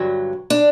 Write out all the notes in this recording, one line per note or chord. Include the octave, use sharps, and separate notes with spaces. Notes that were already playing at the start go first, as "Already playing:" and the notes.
Already playing: G2 D3 F#3
D4